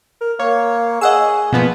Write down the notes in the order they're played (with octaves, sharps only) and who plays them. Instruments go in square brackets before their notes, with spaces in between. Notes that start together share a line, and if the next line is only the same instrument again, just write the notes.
[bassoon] A#4
[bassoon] A#3 [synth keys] C#5
[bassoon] G#4 [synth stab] D#5 F#5 E6
[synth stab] B2 F3 [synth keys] A#3 B3